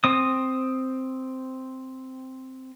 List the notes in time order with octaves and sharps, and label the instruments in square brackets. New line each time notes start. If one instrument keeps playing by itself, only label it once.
[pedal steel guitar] C4 D#6